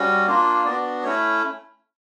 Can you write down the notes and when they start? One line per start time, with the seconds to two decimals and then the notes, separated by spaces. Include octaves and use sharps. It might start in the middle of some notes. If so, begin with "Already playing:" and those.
Already playing: G3 C#4 F#4
0.27 A#3 D4 F4
0.65 B3 D4 F#4 D5
1.04 A3 C#4 E4 C#5